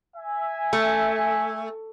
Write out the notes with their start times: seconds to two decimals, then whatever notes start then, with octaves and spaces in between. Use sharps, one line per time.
0.17 E5 G#5
0.73 A3